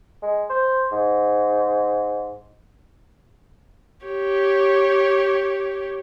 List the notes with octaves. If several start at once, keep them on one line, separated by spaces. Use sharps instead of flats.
G#3
C5
G#2
G4 C#5